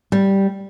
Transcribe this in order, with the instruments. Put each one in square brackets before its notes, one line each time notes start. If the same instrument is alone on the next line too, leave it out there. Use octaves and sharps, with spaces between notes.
[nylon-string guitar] G3